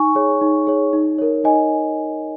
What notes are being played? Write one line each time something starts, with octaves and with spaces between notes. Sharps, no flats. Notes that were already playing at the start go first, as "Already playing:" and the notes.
Already playing: D#4 G#5 C#6
G#4 C#5
D#4
G#4 C#5
D#4
A#4 C#5
D#4 D#5 G#5